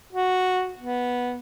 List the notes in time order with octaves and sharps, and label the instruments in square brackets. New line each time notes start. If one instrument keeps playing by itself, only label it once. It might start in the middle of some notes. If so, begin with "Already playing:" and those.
[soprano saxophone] F#4
B3